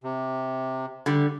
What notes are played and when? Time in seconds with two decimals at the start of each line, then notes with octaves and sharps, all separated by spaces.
0.04 C3
1.06 D3 G3